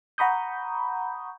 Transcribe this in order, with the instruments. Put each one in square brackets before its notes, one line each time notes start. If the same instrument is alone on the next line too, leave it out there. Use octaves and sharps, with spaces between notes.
[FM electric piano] F#5 A#5 B5 C#6 D#6 G6